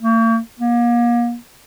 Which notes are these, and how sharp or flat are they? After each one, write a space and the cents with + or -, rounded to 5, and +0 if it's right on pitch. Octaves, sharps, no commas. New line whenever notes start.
A#3 -45
A#3 +35